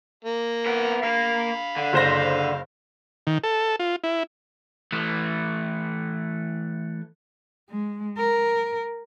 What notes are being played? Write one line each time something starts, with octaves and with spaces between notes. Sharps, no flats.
A#3
B3 A#4
A#3 A#4 F5 B5
D3
F#1 C5 A#6
D#3
A4
F4
E4
E3 A3
G#3
A#4